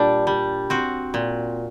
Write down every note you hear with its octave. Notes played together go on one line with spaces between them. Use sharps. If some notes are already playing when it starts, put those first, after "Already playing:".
Already playing: A#2 G3 D4
G3
C4 F#4
A#2